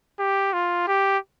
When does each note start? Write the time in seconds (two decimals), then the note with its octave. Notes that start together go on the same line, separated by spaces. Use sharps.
0.19 G4
0.53 F4
0.87 G4